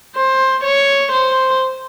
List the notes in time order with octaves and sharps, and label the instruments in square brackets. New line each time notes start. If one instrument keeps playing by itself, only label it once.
[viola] C5
C#5
C5